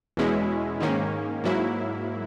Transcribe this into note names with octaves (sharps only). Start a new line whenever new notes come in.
E2 B2 G#3 C#4 E4
G#2 D#3 A#3 C#4
G#2 F#3 A#3 E4